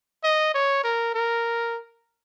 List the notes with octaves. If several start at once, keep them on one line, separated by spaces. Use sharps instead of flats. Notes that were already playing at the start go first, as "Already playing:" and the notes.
D#5
C#5
A#4
A#4